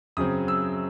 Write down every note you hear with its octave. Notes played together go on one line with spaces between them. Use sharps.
F#2 C#3 F#3 C4 D#6
E6